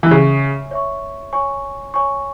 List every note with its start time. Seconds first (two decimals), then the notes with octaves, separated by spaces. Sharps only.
0.03 E3
0.10 C#3 C#5 E5 C#6
0.71 C#5 E5 C#6
1.33 C#5 G#5 C#6
1.94 C#5 G#5 C#6